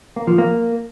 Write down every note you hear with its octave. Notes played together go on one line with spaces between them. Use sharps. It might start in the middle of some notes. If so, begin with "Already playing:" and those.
A#3
F3
A#3